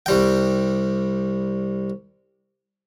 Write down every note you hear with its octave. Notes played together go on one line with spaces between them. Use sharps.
C2 G3 G5